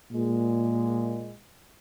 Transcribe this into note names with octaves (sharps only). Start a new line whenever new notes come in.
A#2 G#3